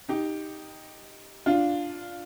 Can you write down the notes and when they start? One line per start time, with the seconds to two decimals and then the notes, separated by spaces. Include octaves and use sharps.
0.09 D#4 G4
1.46 D4 F4